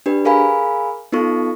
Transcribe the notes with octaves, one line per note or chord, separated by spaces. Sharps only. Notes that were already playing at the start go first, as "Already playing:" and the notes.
D4 G4 B4
G#4 A#4 F5 G#5 B5
B3 D#4 F4 A4 C#6